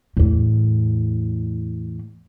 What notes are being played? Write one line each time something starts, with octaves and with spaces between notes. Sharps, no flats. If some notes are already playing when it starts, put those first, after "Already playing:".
E2 A2